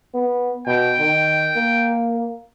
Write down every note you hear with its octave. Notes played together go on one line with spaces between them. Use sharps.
B3
B2 G5
D#3
A#3